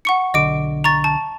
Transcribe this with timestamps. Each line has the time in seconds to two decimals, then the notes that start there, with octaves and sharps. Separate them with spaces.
0.05 F#5 C#6 C#7
0.34 B1 D3 D#5 D6 D7
0.84 A#5 C#6 A6
1.04 A5